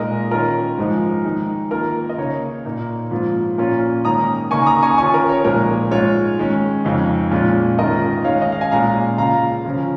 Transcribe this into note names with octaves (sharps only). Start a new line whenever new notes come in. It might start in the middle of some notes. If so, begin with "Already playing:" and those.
Already playing: A#2 G#3 D#4 A#4 D#5
D#3 C#4 F4 A#4
G#2 F3 G#3 D#4
D#3 G#3 D#4
D#3 A#3 F4 A#4
D#5
C#3 A#3 D#4 C#5
A#2 A#3 D#4
G#2 F3 A#3 F4
A#2 A#3 C#4 F4
G#2 D#3 A#3 C#4 A#5 D#6
C#3 A#3 D#4 G#5 C#6
A#5 D#6
G#5 C#6
D#3 C#4 F4 G#5 C#6
A#4
C#5
A#2 F3 G#3 A#4
G#2 G#3 F4 C#5
D#3 G#3 C#4
F2 C#3 G#3 D#4
A#2 G#3 C#4 F4
G#2 D#3 C#4 F4 A#4 D#5
D#3 G#3 D#4 C#5 F5
D#5
F5
G#5
A#2 G#3 C#4 F4 F5 A#5
C#3 A#3 F4 F5 A#5
C#3 F3 C#4